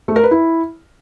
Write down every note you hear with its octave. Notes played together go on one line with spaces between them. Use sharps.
A3
A#4
B4
E4